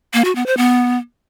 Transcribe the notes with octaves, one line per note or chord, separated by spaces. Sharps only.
A#3
F#4
B3
C5
B3